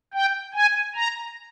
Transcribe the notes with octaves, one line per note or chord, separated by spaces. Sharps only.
G5
G#5
A#5